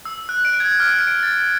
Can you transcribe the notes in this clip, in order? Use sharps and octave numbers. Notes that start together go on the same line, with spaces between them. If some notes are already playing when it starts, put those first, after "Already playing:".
E6
F#6
D7
G#6
F6
D7
A6